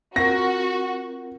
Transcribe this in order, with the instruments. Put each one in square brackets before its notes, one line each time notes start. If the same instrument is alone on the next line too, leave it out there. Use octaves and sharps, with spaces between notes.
[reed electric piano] C4 F4 A#4 [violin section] F#4 [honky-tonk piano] A#6